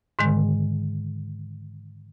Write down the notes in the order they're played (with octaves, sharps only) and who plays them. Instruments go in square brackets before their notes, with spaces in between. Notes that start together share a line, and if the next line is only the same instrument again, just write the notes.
[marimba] G#2 D3 D#3 G#3